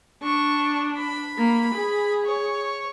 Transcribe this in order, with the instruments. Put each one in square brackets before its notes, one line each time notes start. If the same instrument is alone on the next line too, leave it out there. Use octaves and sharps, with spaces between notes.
[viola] D4 [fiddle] C#6
[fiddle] B5
[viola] A#3
G#4
[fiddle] C#5